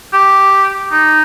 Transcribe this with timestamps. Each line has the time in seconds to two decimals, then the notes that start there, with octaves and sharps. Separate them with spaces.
0.13 G4
0.92 D#4